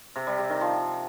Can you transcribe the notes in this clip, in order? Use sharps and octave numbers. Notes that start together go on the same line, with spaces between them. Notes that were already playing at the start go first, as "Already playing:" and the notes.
C3
G3
C3
D#3
F3